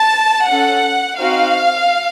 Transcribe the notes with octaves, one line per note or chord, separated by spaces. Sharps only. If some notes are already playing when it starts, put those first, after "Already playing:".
Already playing: A5
C#4 A4 F#5
C4 D#4 F#4 F5